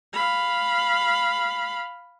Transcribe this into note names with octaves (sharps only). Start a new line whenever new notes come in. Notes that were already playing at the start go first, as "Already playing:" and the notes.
F5 B5